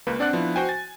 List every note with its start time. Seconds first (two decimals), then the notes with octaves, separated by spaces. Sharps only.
0.07 C#2 A#3 B4
0.19 C4 D4 D5 F#5 F#6
0.33 F3 B3 D4 E4
0.56 F#4 C5 G5 G#5
0.69 G#5 A6